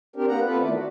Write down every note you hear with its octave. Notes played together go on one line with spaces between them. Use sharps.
C4 D4 G4 A#4
A#3 B3 F#5 A#5
B3 C4 F4 A4 B4
D#3 E3 A3 D5
F#4